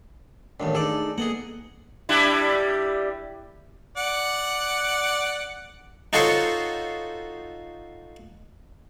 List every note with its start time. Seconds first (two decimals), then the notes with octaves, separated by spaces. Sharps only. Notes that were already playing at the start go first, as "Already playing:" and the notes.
0.60 A1 D#2 A2 A3 D4
0.75 D#4 G#4 A4 D5
1.18 A#3 B3 G#4 A4 D#5 F#5
2.09 G3 D4 E4
3.97 D5 F#5
6.13 D#4 F4 F#4 A4 C5 C#5